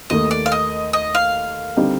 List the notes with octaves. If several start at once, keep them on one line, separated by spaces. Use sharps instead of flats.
D#2 D#3 A3 D#5
D5
F5
D#5
D#5
F5
D3 G3 C4 D#4